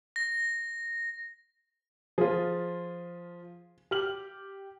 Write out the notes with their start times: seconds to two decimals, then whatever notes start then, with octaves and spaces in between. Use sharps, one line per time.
0.16 A#6
2.18 F3 F4 G#4
3.91 G4 F6 F#7